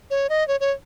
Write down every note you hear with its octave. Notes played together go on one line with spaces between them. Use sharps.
C#5
D#5
C#5
C#5